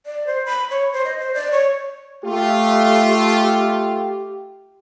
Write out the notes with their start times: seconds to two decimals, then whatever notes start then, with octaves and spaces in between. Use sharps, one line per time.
0.06 D5
0.27 C5
0.46 B5
0.71 C#5
0.93 C5
1.05 D#5
1.19 C5
1.34 D5
1.52 C#5
2.25 A3 F4 G4